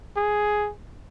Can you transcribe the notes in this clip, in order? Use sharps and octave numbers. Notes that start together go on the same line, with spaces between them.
G#4